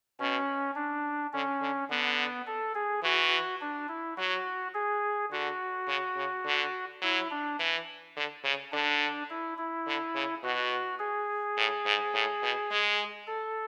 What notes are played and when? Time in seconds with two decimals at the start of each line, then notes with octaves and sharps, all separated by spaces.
0.19 B2 C#4
0.76 D4
1.33 D3 C#4
1.61 D3
1.90 D3 B3
2.47 A4
2.75 G#4
3.03 E3 F#4
3.61 D4
3.88 E4
4.17 F#3 F#4
4.74 G#4
5.31 D3 F#4
5.88 C#3
6.16 C#3
6.46 D3
7.02 F#3 E4
7.31 D4
7.59 E3
8.16 D3
8.44 C#3
8.72 D3 D4
9.30 E4
9.58 E4
9.87 D3
10.15 C#3
10.43 B2 F#4
10.99 G#4
11.57 A2
11.86 G#2
12.14 A2
12.43 B2
12.71 G#3
13.27 A4